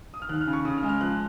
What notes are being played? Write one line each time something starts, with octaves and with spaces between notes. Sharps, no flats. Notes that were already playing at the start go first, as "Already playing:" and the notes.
D#6
F6
D#2 F#6
F6
C#3
C#6
C#3 D#6
F6
G#3
F6
F3 F#6